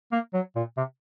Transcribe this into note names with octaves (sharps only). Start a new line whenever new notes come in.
A#3
F#3
A#2
C3